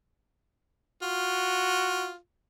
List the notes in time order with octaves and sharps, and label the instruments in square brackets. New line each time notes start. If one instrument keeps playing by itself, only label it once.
[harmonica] F4 [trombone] F#4